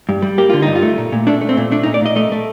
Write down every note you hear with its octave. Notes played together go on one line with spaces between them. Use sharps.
G2
G3
A#3 G4
D3 F4
G2 D#4
F4
A3
A#2
A#2
A3 D4
A3
C4
A#2
A3 D4
D#4
A#2
D5
A#2 D#5
A3 D#5
A3